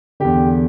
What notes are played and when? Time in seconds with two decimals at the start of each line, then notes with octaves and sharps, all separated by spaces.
0.20 E2 D3 G4